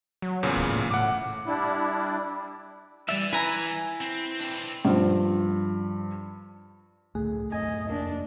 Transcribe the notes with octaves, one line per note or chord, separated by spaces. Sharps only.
F#3
E2 A#2 C#3
D1
A2
A2 F#5 D6
G3 D4 E4
E3 G3 D5 E5
E4 B4 G#5 A#5
C4
C4 D4
G2 F3
C#2 A2 D3 A3 G#4
F#2 A2 C4 D#5 G#5
F1 F2 A#3 D4